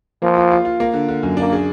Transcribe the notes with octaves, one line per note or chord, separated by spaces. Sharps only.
F3 A#3
F4
F4
F4
A#3
D3
D3
F#2
A#3 D4
G#4